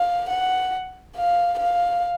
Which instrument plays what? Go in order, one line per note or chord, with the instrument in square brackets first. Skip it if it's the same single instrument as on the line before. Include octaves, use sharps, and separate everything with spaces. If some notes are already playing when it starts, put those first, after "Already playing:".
Already playing: [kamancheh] F5
F#5
F5
F5